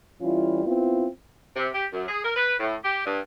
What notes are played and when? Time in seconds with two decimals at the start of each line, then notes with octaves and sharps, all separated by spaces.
0.21 E3 G3 C#4 E4 F4
0.66 B3 C4 E4 F4
1.56 C3
1.74 G4
1.92 F#2
2.07 G#4
2.23 A#4
2.36 B4
2.60 A2
2.83 G4
3.05 G2